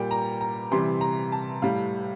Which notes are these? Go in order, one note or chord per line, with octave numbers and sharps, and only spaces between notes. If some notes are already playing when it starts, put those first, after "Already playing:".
Already playing: A#2 G3 G5
A#5
A#5
C3 E3 G3 C6
A#5
A5
A2 G3 F5